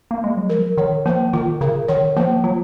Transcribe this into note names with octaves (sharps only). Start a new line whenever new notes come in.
A#3
G#3
F#3
F3 A#4
D#3 C#5
F3 A#3
D#3 F4
C#3 A#4
D#3 C#5
F3 A#3
F#3 F4